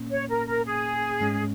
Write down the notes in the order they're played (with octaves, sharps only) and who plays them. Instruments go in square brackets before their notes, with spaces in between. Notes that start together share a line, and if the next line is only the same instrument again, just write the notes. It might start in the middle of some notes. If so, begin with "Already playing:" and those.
Already playing: [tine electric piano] A#2 A#3 C#4
[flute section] C#5
A#4
A#4
G#4
[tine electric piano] G#2 G#3 C#4